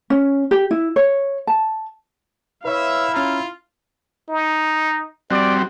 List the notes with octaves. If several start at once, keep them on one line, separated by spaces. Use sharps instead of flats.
C#4
G4
E4
C#5
A5
E4 B4 C#5 E5 F5
C#4 F4 A#5
D#4
G3 C4 F#4 D5